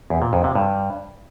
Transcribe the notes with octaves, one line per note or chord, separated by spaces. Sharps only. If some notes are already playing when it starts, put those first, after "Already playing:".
E2
A#2
F2
C3
G2